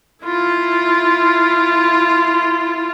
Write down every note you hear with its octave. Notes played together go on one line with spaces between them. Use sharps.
E4 F4